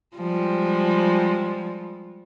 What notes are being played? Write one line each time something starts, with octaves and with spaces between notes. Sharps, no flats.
F3 G3 G#3